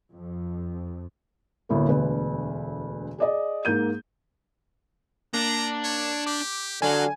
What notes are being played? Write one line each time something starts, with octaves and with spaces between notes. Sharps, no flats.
F2
G1 D2 A2 A#3
E1 D2 B4
G#4 D5 D#5
G#2 A#3 G6 D#7
A#3 D4 A#5
C#5
G4 D6
D3 F#3 F5 G#5